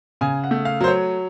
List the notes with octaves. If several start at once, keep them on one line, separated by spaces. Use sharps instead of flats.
C#3 G#5
F#5
A3
F5
F#3 C5
C#5